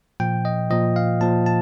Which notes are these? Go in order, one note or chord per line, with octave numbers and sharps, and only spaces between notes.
A#2 F3 G5
D#5
A#2 F3 D#5
F5
A#2 F3 A5
A5